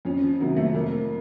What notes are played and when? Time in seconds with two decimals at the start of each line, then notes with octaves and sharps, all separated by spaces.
0.05 F2 C#4
0.22 F3
0.40 C3 D#3 F#3
0.56 A3
0.74 F2 A#3